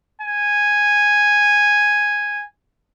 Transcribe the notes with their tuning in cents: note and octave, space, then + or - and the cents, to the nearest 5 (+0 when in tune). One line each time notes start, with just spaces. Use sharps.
G#5 -5